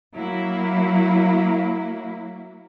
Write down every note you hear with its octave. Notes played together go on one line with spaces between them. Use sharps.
F#3 A#3 E4